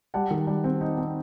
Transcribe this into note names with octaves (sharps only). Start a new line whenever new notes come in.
G3 F#5 A5
D#3
G3
C4
D#4
C4